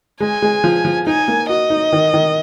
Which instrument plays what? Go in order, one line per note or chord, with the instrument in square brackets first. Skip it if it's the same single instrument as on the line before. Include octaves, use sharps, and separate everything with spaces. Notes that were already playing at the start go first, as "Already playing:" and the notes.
[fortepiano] G#3 [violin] G#5
[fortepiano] G#3
F3
F3
[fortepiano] D#4 [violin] G#5
[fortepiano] A#3
[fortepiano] F#4 [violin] D#5
[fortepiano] D#4
D#3
D#3